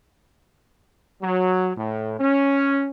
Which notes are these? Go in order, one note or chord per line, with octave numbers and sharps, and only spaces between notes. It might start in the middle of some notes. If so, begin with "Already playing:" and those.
F#3
A2
C#4